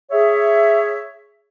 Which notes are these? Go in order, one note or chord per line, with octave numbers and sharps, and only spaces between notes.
G#4 C#5 E5